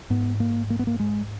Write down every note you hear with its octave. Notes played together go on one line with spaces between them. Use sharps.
G#2 B3
A#3
A#3
B3
A#3
G#3